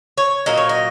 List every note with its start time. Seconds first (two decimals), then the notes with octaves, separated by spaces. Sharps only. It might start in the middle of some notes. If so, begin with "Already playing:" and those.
0.18 C#5
0.46 A#2 F#3 A#3 D#5
0.58 C#5
0.69 D#5